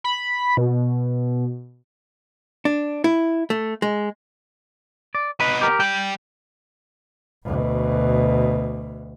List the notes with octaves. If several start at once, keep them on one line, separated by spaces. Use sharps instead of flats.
B5
B2
D4
E4
A3
G#3
D5
B3 D#4 B4
G4 A#4
G3 G5
D2 B2